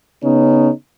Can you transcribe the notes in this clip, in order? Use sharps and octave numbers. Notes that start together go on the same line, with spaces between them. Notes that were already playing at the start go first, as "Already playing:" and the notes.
C#3 B3 C#4 D#4